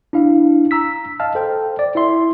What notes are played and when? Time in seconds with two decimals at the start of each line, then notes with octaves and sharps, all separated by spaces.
0.13 D4 E4 F5
0.71 A#5 E6 B6
1.20 D#5 F5 A5 F6
1.35 A4 C5 G5
1.79 D5
1.95 E4 D5 E5 C6